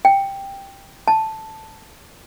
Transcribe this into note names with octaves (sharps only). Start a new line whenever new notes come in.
G5
A5